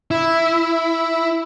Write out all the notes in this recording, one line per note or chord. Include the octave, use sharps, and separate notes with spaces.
E4